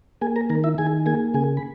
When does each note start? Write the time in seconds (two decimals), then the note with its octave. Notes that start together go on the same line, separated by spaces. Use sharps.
0.21 A#3 G#4 G#5
0.36 A#4 A#5
0.50 D#3 A#4 A#5
0.64 E4 E5
0.78 D#3 G#4 G#5
1.06 A#3 G#4 G#5
1.34 C#3 G#4 G#5
1.57 B5